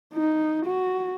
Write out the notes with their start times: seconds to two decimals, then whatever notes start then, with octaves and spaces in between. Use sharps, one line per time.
0.14 D#4
0.66 F#4